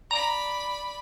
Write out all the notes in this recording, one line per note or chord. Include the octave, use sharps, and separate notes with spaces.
D5 A#5 B5